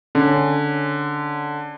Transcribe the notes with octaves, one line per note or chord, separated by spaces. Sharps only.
D3 C#4